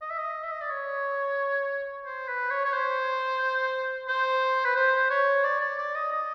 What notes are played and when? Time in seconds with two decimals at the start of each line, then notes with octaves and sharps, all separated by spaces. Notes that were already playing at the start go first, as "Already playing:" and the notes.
0.02 D#5
0.10 E5
0.18 D#5
0.43 E5
0.52 D#5
0.61 D5
0.70 C#5
2.05 C5
2.27 B4
2.51 C#5
2.65 C#5
2.73 C5
4.08 C5
4.64 B4
4.75 C5
5.10 C#5
5.44 D5
5.60 D5
5.78 D5
5.95 D#5
6.12 D#5